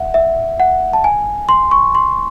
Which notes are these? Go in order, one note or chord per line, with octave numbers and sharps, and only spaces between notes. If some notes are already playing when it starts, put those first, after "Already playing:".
Already playing: E5 F#5
E5
F#5
A5
G#5
C6
C#6
C6